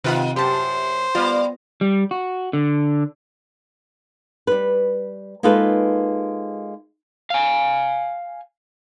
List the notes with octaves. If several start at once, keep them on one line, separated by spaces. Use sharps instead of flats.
C3 D#3 F4 B4 F#5
F#2 G4 C5 A5
G3 B3 F4
G3
F#4
D3
G3 B4
G#3 A#3 D#4 F4 A4 B4
F5 G#5